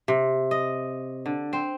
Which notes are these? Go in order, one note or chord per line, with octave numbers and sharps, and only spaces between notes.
C3
D#5
D3
C4